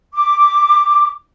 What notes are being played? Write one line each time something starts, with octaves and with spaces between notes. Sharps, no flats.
D6